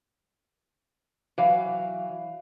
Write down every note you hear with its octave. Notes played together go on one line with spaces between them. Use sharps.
E3 F#3 F5